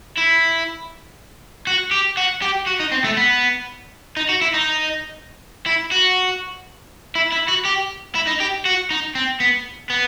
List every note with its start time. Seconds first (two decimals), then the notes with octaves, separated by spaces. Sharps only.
0.17 E4
1.67 F#4
1.91 G4
2.17 F#4
2.42 G4
2.66 F#4
2.80 D#4
2.91 C4
3.04 A3
3.17 B3
4.16 D#4
4.29 F#4
4.41 E4
4.54 D#4
5.66 E4
5.91 F#4
7.15 E4
7.32 E4
7.49 F#4
7.66 G4
8.16 E4
8.27 D#4
8.40 G4
8.65 F#4
8.91 D#4
9.15 C4
9.40 B3
9.90 B3